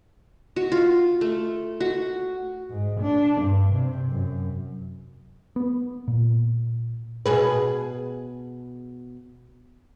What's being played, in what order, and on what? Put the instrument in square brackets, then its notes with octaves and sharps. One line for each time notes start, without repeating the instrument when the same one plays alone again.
[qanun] F#4
F4
A3
F#4
[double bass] G#2
D4
G2
C3
F#2
[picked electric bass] B3
A#2
[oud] B2 G#4 B4